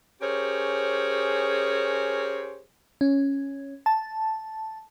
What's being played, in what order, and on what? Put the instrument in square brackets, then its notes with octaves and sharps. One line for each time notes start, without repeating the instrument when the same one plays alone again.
[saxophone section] C#4 G4 G#4 A#4 C5 C#5
[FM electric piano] C#4
A5